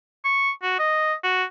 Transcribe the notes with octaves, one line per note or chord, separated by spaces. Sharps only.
C#6
F#4
D#5
F#4